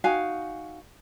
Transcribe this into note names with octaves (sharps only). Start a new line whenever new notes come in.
D#4 F#4 F5 G#5